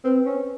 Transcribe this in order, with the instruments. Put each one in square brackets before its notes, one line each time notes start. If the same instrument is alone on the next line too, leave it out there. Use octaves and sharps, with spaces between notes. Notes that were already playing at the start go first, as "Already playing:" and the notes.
[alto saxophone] C4 [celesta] B4
[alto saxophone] C#4